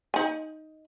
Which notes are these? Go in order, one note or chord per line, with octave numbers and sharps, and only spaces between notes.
D#4 G#5